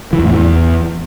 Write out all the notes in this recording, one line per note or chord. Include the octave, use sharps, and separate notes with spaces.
E3
E2
A2
E2